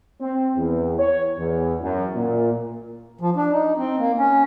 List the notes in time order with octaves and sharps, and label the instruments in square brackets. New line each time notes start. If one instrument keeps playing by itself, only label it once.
[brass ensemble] C4
E2
C#5
E2
F#2
A#2
[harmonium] F3
D4
D#4
C4
A#3
C#4